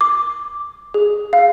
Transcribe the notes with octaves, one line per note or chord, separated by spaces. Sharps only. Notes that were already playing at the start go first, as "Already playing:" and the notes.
D6
G#4
F5